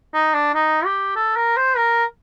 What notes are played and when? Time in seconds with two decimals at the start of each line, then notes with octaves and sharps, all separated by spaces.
0.14 D#4
0.34 D4
0.54 D#4
0.85 G4
1.16 A4
1.36 A#4
1.57 C5
1.77 A#4